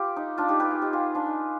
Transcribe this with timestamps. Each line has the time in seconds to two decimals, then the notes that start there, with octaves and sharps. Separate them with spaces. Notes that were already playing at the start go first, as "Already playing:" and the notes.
Already playing: F4 G4 B4
0.16 D#4
0.38 D4 F4
0.49 D#4 G4
0.60 G4 B4
0.70 F4 G#4
0.82 D#4 G4
0.93 F4 G#4
1.14 D4 F4
1.26 D#4